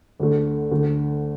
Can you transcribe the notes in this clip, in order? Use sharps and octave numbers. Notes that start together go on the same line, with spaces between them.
D2 D3 A3
D2 D3 A3